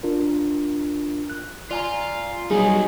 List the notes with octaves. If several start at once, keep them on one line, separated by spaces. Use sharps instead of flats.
D4 F4 A#4
F#6
F4 D5 G#5 A#5
F#3 G3 D#4 G#4